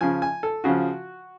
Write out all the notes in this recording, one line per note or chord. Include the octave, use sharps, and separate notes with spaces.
C#3 F3 G#5
G#5
A4
C#3 F3 F#4